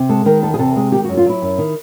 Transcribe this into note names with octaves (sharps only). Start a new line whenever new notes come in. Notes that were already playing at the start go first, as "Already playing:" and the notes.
Already playing: C3
G#3 A4
D#3 A#4
E2 A4
G#4
C3 A4
G#3 G#4
D#3 G4
F#4
F#2
F4
F#3 E4
F#2
D#3